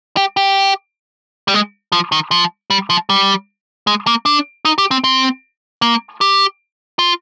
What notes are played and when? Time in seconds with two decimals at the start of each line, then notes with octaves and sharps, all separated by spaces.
0.17 G4
0.37 G4
1.48 G3
1.54 G#3
1.92 F3
2.12 D#3
2.31 F3
2.70 G3
2.90 F3
3.10 G3
3.87 G#3
4.07 A#3
4.26 D4
4.65 D#4
4.78 G4
4.91 C4
5.04 C4
5.82 A#3
6.21 G4
6.99 F4